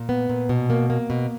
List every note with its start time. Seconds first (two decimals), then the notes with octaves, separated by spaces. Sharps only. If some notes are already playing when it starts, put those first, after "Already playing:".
Already playing: A#2
0.09 B3
0.29 A#2
0.49 B2
0.70 A#3
0.90 A#3
1.10 B2